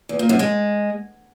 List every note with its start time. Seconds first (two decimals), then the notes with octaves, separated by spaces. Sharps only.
0.09 E2
0.19 A#2
0.29 F#2
0.39 G#3